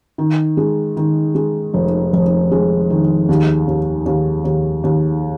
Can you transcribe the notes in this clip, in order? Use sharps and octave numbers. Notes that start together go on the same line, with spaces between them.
D#3
G#3
D#3
G#3
F1
F1
G#3
D#3
D#2
D#2
D#2
D#2
D#2